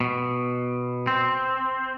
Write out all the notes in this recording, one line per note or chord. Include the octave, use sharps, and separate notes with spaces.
B2
C4